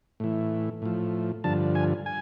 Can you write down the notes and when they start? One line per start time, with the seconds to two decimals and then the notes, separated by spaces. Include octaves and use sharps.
0.20 A2 E3
0.82 A2 F3
1.44 G2 D3 F3 A5
1.75 G#5
2.06 G#5